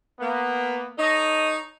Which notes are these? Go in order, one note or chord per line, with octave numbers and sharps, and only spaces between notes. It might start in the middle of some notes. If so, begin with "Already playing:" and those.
A#3 B3
D#4 A4 C#5 D#5